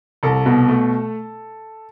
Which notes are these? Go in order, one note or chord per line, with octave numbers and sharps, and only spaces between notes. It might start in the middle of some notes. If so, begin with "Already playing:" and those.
C2 A4
B2
A3